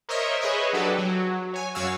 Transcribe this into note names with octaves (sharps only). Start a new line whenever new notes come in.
A#4 C5 C#5 D#5 E5
G#4 B4 C#5 D#5 E5
F#3 D4 F#4 G4 A4 B4
F#3
C#5 G#5
F#2 F#4 C#5 F5 E6